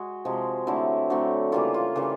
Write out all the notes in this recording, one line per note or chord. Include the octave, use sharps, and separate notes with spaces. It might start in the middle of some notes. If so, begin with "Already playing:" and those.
Already playing: G#3 F#4
C3 F3 G#3
D3 F#3 A3 C4 E4
D3 F#3 A3 C4
C#3 E3 G3 A#3 F4
F4
C#3 E3 G3 A#3